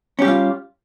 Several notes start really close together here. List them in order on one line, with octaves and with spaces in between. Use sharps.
C#4 G4 G3 F4